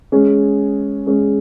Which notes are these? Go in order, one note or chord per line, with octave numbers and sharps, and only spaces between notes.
G#3 C#4 G#4
G#3 C#4 G#4